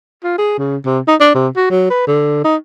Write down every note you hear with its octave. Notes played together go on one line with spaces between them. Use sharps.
F4
G#4
C#3
C3
D#4
D4
C3
F#4
F#3
B4
D3
D#4